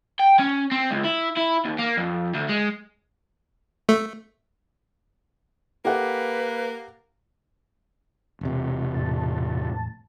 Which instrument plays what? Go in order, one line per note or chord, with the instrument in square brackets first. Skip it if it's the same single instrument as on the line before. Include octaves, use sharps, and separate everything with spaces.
[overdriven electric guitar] G5
C#4
C4
C#2
E4
E4
D#2
A#3
F2
D2
G#3
[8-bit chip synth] A3
[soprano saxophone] A#3 [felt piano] G4 A4 F#5 [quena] B4
[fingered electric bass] E1 C3
[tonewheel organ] E2 A2 A5